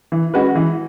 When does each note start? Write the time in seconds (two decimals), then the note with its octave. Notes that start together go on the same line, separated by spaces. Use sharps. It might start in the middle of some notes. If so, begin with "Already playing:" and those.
0.12 E3
0.34 G#3 C#4 F#4 B4
0.55 E3